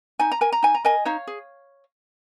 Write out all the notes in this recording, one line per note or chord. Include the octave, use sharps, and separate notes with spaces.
D#4 G#5
A#5
A#4 G#5
A#5
D#4 G#5
A#5
A#4 D#5 G#5
D#4 C#5 F5
G#4